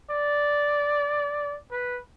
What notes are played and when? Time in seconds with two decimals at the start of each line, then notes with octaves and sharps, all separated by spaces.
0.10 D5
1.71 B4